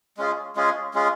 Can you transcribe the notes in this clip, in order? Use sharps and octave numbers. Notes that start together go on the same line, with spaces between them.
G#3 C#4 F4 G#4
G#3 C#4 F4 G#4
G#3 C#4 F4 G#4